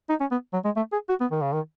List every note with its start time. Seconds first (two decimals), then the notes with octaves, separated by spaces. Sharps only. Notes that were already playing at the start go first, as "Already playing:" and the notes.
0.09 D#4
0.20 C#4
0.31 B3
0.53 F#3
0.65 G#3
0.76 A3
0.92 G#4
1.09 F#4
1.21 B3
1.31 D#3
1.42 C#3
1.53 D#3